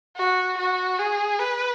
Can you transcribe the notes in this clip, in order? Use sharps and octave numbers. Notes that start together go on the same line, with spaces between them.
F#4
F#4
G#4
B4